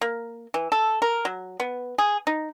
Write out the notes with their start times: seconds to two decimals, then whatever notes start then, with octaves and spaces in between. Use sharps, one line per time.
0.01 A#3
0.54 E3
0.72 A4
1.02 A#4
1.25 F#3
1.60 B3
1.98 G#4
2.27 D#4